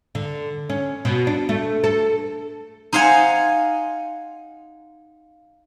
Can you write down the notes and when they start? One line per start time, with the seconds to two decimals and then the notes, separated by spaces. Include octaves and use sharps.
0.15 D3
0.70 C#4
1.05 B2
1.27 D4
1.49 A3
1.84 A4
2.93 D#4 C5 F5 F#5 G#5